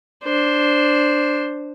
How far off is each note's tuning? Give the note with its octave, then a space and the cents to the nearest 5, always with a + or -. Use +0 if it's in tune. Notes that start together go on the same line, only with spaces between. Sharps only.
D4 +0 C5 +0